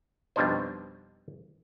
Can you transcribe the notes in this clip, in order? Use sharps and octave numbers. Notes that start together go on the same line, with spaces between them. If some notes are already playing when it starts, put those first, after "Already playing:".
F2 B2 G3 D4 D#4 C5